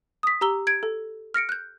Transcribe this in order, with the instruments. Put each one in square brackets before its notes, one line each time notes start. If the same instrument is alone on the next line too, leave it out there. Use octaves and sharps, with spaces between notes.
[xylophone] D#6 B6
G4 A#5 E6 G7
G#6 D7
A4
F6 A#6 C#7 D7
F#6 G6